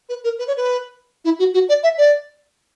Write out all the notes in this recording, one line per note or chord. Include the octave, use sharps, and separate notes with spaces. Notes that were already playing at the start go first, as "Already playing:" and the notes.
B4
A#4
B4
C#5
B4
E4
F#4
F#4
D5
E5
D5